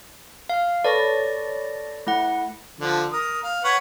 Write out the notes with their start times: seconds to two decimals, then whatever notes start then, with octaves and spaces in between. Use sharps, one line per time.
0.49 F5 F6
0.85 A4 B4 C#5 D5 A6 A#6
2.07 A3 E4 F#5
2.80 D3 F3
3.12 A#4 D#6
3.43 F5
3.64 B4 C#5 F#5